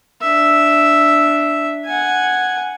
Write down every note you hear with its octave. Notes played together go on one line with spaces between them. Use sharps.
D4 E5
F#5 G#5